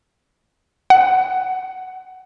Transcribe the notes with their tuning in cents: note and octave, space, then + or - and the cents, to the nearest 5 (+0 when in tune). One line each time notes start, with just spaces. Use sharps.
F#5 +15